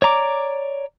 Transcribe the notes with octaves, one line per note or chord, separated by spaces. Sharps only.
C#5 D5 A#5 D6